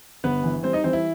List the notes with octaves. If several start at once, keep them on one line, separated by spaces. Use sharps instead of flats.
G1 B3 B4
E3
G3 C4 C5
D#4 D#5
E3 C4 C5
E4